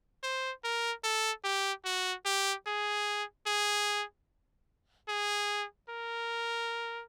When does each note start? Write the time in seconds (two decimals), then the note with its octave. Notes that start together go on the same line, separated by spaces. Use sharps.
0.23 C5
0.64 A#4
1.04 A4
1.44 G4
1.85 F#4
2.26 G4
2.67 G#4
3.47 G#4
5.09 G#4
5.90 A#4